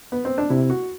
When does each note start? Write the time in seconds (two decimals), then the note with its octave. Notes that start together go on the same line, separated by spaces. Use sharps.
0.12 B3
0.25 C4
0.38 D4
0.50 C3 E4
0.70 F#4